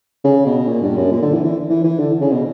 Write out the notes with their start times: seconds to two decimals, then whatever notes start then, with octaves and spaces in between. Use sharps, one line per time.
0.24 C#3
0.46 B2
0.68 A#2
0.82 G2
0.97 F#2
1.12 A#2
1.22 D3
1.34 E3
1.44 E3
1.69 E3
1.84 E3
1.99 D3
2.21 C#3
2.32 B2